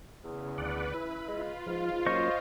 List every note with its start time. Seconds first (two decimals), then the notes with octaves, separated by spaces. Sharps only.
0.24 E2 C#3
0.58 D2 B4 D5 F#5
0.94 E3 E4 B5
1.28 G#3 F4
1.66 G#2 F3
2.06 F#3 A#3 C#4 C5 D#5 C#6